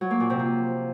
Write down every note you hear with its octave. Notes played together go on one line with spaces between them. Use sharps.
F#3
A#3
A#2
C3
F3